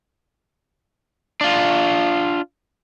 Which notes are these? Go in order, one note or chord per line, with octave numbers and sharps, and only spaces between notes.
D4 F4